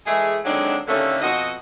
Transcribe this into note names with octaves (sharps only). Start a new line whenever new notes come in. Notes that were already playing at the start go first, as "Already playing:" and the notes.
E3 G#3 A3 G#4
D3 D#3 F#3 G#3 C4 D4
D#2 A2 D3 A3 A#3 C#4
F2 B2 F#4 D#5